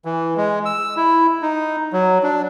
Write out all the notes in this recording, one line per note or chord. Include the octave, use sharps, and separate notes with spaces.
E3
G#3
E6
E4
D#4
F#3
D4